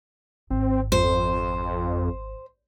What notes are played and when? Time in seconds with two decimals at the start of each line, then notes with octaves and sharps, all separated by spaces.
0.50 G#1 C4
0.92 F2 C5